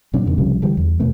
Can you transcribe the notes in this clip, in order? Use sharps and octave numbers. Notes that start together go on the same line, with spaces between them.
A#2 F#3 C4 D4
F2 A#2 D3 D#3
C2 C#3 F3 G3
D3 E3 G3
E2
D#2 B2 A3 B3